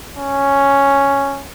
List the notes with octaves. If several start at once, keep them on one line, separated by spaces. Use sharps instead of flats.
C#4